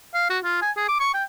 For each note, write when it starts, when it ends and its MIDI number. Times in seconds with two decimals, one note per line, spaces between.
0.15 0.29 77
0.30 0.39 66
0.44 0.59 65
0.62 0.71 80
0.77 0.85 68
0.88 0.99 86
1.00 1.13 85
1.14 1.24 79